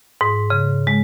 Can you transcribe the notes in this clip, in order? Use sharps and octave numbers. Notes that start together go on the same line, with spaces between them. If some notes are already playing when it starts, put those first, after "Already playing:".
G#2
C#3
G#3